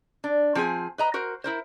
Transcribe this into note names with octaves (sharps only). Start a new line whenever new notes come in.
D4
F3 C4 G#4 A#4 G#5
B4 D#5 A#5
F#4 A#4 C5
E4 A#4 C5